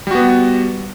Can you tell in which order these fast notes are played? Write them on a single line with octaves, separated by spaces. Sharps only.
G3 F#4 B3